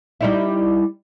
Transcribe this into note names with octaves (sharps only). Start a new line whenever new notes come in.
G3 D#4 E4